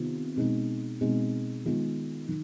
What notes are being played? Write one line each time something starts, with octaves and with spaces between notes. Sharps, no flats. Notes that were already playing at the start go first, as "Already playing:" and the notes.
Already playing: C3 D#3 B3 F4
B2 G#3 C4 D#4
B2 G#3 C4 D#4
D#3 G#3 B3 F4
D#3